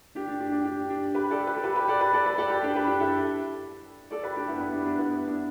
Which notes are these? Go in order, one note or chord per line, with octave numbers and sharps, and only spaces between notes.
D4 G4
D4
D4 G4
D4 G4
D4 G4
D4
G4 B4
A4 D5
G4 B4
A4
G4 B4
G4 B4
A4 D5
G4 B4
A4 D5
G4 B4
A4 D5
G4 B4
D4 G4
G4 B4
D4 G4
E4 A4
A4 D5
G4 B4
D4 G4
B3 E4
B3
D4
D4
B3 E4
B3
D4